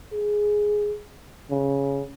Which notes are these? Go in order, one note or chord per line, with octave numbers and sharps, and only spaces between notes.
G#4
C#3